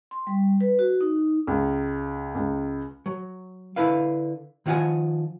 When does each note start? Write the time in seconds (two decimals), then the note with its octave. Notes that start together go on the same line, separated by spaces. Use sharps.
0.11 C6
0.27 G3
0.61 B4
0.79 F#4
1.01 D#4
1.47 C#2
2.35 C#2
3.06 F#3
3.76 D3 E4 B4 F5
4.66 D#3 F3 F4 F5 F#5 G#5